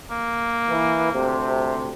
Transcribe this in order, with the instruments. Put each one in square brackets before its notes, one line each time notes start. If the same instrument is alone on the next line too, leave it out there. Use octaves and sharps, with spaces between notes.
[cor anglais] A#3
[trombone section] E3
D2 C3